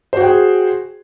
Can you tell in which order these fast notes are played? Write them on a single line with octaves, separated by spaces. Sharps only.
C5 F#4 G5 G#4